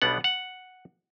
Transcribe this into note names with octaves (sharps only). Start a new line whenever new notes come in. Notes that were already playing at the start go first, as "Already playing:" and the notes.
B1 B2 G3 B3 D4 F#5
F#5